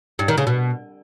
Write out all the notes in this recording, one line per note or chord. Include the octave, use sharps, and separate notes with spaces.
G2
D#3
C#3
B2